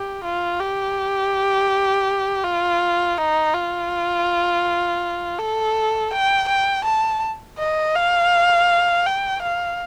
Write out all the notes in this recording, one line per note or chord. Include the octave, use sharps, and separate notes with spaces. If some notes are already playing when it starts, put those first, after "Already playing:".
Already playing: G4
F4
G4
F4
D#4
F4
A4
G5
G5
A5
D#5
F5
G5
F5